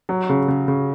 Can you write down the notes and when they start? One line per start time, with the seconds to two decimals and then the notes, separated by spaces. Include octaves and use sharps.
0.09 F#3
0.29 C#3
0.48 C#3
0.68 C#3